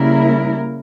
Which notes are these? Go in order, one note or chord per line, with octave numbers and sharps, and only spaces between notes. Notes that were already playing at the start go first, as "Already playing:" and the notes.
Already playing: C#3 G3 A#3 E4 A#4